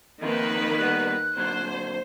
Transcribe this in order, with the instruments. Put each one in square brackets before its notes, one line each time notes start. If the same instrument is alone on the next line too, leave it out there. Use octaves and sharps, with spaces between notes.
[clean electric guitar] F2 D#4 F4 [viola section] D#3 A#3 B4
[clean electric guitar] G3 B3 [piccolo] F#6
[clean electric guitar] A#2 D3 F#3 [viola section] C5